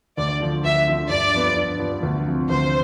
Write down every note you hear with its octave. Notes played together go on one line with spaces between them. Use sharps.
D2 D5
D3 F3
D2 E5
D3 F3
G2 D5
F3 B3
G2
F3 B3
D2
C3 F3
D2 C5